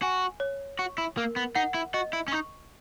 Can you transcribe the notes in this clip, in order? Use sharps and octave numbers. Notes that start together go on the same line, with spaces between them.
F#4 G#5
C#5
F#4 C#6
E4
A#3 A#4
B3
D#4 F#5
E4
F#4 D#5
E4
C#4
D#4 C#6